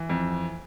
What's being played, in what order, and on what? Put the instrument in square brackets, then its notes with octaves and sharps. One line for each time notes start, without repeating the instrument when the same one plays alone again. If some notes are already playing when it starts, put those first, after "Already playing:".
Already playing: [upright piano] E3
F2